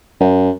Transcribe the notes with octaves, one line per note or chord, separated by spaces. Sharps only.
F#2